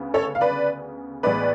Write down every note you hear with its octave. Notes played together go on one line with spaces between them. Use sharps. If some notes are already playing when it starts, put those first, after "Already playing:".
Already playing: D2 C#3 B3
A4 C#5
F5
B4 D5
A1 A2 G#3 B3 B4 D5